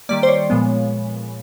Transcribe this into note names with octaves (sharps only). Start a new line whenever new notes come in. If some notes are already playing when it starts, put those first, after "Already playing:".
D#3 G3 A#3 D5
C5
C#5
A#2 F3 G#3 B3